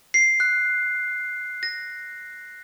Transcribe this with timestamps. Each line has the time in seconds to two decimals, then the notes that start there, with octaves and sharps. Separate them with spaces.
0.14 C7
0.40 F#6
1.63 A#6